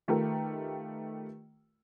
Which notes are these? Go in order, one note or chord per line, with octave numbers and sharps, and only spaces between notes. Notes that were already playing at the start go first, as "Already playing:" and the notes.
D#3 A3 F4 G4 A#4 B4